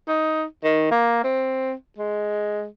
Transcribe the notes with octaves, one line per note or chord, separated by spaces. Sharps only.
D#4
D#3
A#3
C4
G#3